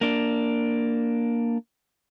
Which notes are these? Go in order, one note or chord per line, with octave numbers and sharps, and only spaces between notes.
A#3 D4